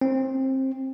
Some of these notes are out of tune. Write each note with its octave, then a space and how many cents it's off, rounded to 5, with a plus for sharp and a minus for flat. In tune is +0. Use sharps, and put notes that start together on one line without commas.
C4 +20